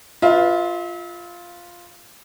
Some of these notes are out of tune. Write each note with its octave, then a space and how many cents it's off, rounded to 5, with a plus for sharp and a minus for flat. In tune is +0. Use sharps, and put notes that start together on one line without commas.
F4 +0 B4 +0 E5 -40